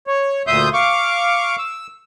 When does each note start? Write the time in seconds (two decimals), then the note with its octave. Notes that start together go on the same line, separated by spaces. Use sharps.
0.07 C#5
0.47 D2 A#2 E5 C6 D#6 G6
0.74 F5 C#6 D6
1.59 E6